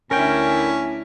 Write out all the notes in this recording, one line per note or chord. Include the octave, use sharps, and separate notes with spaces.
D2 C#4 D4 E4 A#4 G5